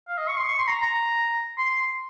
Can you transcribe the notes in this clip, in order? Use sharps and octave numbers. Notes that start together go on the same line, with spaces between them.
F5
D#5
C#6
C6
C#6
C6
A#5
A#5
C6